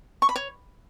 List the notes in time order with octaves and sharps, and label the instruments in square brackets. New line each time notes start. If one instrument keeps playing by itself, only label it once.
[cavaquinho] C#6
B5
C#5